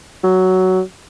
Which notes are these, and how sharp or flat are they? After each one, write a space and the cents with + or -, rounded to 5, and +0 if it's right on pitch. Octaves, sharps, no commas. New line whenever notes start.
F#3 +10